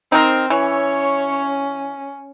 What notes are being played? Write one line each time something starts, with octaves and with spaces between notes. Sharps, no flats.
C4 D#4 A#4
E3 C#4 C#5